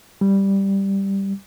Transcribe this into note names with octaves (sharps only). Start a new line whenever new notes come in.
G3